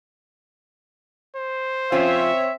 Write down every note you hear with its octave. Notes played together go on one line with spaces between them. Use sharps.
C5
F3 C4 C#4 F4 C#5 E5